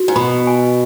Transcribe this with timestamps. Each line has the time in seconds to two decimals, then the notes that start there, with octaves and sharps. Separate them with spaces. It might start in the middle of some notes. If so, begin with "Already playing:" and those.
Already playing: F#4
0.08 G#2
0.16 B2 B5
0.47 G#5